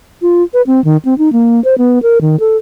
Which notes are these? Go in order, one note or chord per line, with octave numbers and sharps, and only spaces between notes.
F4
B4
C4
D#3
C4
D#4
A#3
C5
B3
A#4
D#3
A4